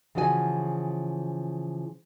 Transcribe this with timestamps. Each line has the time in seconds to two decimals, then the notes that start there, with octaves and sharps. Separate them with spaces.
0.15 C#3 E3 F3 F#4 D5 G#5